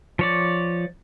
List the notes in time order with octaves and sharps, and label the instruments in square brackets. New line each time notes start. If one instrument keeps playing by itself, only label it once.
[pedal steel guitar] F3 C#5 D5